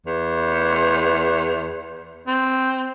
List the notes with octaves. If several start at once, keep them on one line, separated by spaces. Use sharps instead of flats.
E2
C4